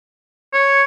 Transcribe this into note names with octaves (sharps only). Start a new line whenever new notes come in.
C#5